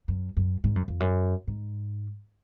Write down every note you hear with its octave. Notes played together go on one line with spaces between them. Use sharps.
F#2
F#2
G#2
F#2
F2
F#2
G#2